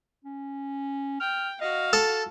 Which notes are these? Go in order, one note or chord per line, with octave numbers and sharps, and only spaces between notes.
C#4
G5 F6
F#4 D#5 F5
A4 A5